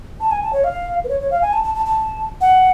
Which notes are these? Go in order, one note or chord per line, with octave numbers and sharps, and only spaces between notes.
A5
G#5
A5
C#5
F5
B4
C#5
C#5
F5
G#5
A5
A5
A5
A5
F#5